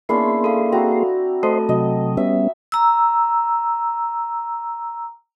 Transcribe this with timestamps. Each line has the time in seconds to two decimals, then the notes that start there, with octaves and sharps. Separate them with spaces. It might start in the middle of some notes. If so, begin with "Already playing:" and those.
0.09 A#3 B3 C#4 D4 E4 G#4 C6
0.44 A4 F5
0.72 C4 F#4 A#5
1.43 A3 A4 C5 D#5 A5 C6
1.69 C3 F#3 D#5
2.17 G3 B3 C#4 E5
2.72 A#5 E6